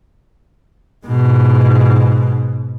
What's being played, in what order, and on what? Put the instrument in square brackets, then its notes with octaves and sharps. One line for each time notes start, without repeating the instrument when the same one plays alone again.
[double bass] G#2 B2